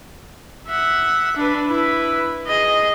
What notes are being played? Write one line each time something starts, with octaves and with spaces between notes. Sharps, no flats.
E5 F#5
D4 B4
E4 B4
G#4 D#5